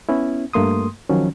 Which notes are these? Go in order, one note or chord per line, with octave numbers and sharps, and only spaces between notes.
B3 C#4 E4
G2 A3 A#3 C6 D#6
D#3 F3 F#3 C#4